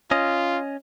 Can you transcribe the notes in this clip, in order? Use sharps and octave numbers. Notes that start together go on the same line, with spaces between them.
C#4 F4 D#5